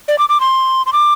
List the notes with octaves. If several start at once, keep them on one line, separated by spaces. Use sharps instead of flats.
D5
D6
D6
C6
C6
D6